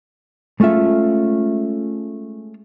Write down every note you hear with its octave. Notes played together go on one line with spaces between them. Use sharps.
G#3 A3 C#4 F4 E5